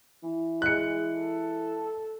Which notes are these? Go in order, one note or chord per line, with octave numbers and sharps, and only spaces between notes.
E3
G#3 F#6 C#7
A4